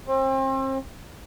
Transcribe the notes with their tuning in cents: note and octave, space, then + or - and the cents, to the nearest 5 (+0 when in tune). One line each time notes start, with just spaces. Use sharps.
C4 +35